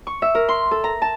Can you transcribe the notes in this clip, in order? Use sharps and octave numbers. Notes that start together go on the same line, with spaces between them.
C#6
E5
A#4
C6
A4
A#5
A5